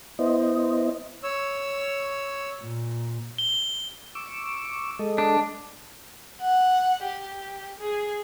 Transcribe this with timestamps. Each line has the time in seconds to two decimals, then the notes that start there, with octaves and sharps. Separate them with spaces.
0.19 B3 E4 C5 D#5
1.23 C#5 E6
2.62 A#2
3.38 G7
4.15 C#6 D6 E6
4.99 G#3 A4 D#5
5.18 D4
6.42 F#5
7.04 G4
7.79 G#4